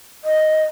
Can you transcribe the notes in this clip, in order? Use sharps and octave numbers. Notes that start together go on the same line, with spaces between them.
D#5